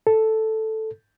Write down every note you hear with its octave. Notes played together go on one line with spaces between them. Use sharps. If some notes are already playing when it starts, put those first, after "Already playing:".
A4